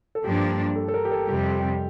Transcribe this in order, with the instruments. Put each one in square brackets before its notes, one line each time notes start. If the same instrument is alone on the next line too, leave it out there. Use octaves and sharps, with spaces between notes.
[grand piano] A4
[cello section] G2 F3 A#3 D4 [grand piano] G4
[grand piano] A4
A4
A#4
G4
A4
[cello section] F2 C3 G3 [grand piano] G4